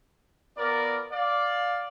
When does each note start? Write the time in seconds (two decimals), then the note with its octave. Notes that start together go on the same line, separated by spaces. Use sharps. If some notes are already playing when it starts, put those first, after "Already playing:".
0.57 B3 F4 A#4 D5
1.11 D5 F5